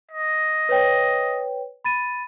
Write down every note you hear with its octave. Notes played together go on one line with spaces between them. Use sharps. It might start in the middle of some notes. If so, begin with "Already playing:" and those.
D#5
B4 C#5 G5
B5 A6 D#7